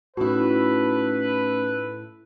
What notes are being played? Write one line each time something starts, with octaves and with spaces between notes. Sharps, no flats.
A2 A3 C#4 D#4 E4 F#4 A4 B4